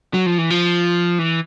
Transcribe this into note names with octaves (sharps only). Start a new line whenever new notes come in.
F#3
F3
E3
F3
E3